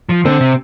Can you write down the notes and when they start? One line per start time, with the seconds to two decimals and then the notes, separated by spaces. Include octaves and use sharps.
0.09 F3
0.25 D3 C4
0.41 C3